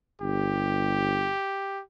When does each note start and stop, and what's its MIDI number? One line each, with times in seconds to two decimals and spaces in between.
0.22 1.33 31
0.22 1.82 67